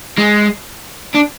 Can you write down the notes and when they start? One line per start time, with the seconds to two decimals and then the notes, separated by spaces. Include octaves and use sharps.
0.18 G#3
1.14 D4